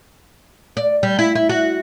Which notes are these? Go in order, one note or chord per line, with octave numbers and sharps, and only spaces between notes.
D5
G3
E4
E4
F#4